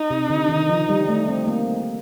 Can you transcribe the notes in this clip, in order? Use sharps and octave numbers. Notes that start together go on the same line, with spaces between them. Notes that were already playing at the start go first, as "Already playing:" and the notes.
Already playing: D#4
C3
D3
D#3
F3
G3
A3
C4
A#3